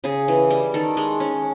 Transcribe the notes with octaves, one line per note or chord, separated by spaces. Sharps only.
C#3 G#4
E3
G3
D#3 A4
G#3
C#4